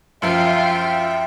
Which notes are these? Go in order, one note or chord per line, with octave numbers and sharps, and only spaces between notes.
F#2 F3 F4 E5 G5